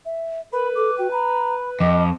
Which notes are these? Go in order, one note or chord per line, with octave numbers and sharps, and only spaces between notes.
E5
A#4 B4 B5
A4 D6
F#4 G5
A#5 B5
F2 D#5 D6